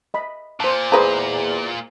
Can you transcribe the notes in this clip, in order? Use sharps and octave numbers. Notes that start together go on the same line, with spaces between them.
D#5 B5
A#2 C5 A5
E2 G#3 B4 C5 A#5